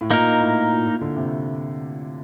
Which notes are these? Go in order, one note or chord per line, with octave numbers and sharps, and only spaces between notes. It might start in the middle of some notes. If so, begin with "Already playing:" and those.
A2
A#2 A#3 D#4 A#4
A2
A#2
A#2
D3
C3